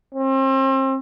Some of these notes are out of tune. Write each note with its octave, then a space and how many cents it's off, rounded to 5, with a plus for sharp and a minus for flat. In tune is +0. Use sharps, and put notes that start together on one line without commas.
C4 +35